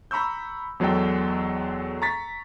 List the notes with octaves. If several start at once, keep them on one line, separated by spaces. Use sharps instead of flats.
A#5 B5 C#6 E6 G6
E2 F#3 G#3 A4 G5
A#5 C#6 A6 B6